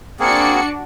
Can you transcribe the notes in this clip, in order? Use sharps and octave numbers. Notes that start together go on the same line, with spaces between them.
A#3 C4 D4 F#4 G#4 C#7